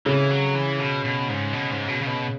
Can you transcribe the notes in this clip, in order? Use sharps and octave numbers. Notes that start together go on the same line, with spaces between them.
C#3 E3
F#3
E3
B2
B2
G#2
B2
G#2
B2
C#3
B2